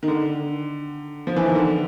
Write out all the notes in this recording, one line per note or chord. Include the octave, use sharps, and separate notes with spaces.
D#3
D3
F3
E3
D#3
D3